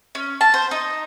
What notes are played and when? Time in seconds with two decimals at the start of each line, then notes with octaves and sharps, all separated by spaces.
0.15 C#4
0.41 A5
0.54 C5
0.71 D#4